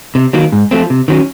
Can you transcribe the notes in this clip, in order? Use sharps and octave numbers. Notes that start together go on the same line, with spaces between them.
C3
D#3 F#3 A#3
G#2
F3 A3 C4
C3
D#3 F#3 A#3 C#4